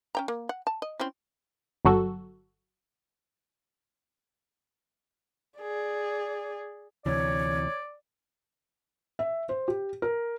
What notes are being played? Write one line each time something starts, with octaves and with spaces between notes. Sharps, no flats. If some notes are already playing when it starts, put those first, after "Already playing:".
C#4 G5 A#5
A#3
F#5
A5
D#5
C4 C#4 E4
G1 F#3 F#4 A4
G#4 D5
D2 C3 E3 C#5 D5
E5
C5
G4
A#4